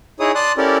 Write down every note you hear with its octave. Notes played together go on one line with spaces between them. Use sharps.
D#4 E4 G#4 C#5 D#6
D5 A5 C6 D#6 F#6
C#4 E4 G4 A4 A#4 D5